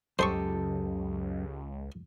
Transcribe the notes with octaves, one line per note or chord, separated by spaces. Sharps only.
C#2 F#2 G4 A4 C5 D#5 C6 C#6